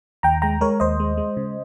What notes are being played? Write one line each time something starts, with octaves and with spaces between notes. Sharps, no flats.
D#2 G5 A#5
G#3 G5 A#5
G#3 A#4 C#5
D#2 C5 D#5
G#3
G#3
C#3